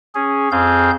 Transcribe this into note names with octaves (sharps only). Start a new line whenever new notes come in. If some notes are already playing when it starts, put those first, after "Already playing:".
C#4 G#4
F2 C4 G#4 F5 G6